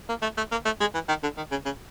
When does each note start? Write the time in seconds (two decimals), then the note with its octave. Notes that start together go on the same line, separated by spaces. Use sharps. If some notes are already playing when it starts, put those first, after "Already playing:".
0.09 A#3
0.22 A3
0.37 A3
0.52 A#3
0.65 A3
0.80 G#3
0.94 E3
1.08 D#3
1.23 D3
1.37 D#3
1.51 C#3
1.65 C#3